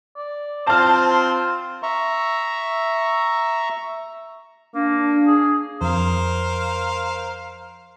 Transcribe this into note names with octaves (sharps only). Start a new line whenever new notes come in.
D5
C4 F4 C5 A5 F6
E5 A#5 C#6
A#3 D4
G#4
F2 A#4 C5 F5